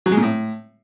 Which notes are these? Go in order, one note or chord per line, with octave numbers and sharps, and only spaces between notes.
F#3
G#3
A#2
A2